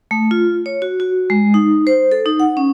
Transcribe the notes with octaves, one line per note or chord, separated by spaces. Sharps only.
A3
F4
C#5
F#4
F#4
G#3
D#4
C5
A4
D#4
F#5
C#4